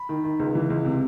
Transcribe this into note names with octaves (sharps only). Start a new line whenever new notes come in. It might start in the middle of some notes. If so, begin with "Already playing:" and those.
Already playing: B5
D#3
D#3
C#2
E3
C#2
C3